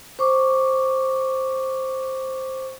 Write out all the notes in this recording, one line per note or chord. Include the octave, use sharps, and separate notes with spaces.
C5 C#6 D6